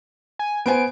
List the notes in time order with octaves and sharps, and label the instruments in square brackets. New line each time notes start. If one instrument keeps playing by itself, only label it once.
[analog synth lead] G#5
[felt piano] B3 C5 G#5 [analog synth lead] D7